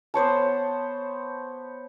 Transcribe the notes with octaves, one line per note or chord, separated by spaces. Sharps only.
B3 C5 C#5 A5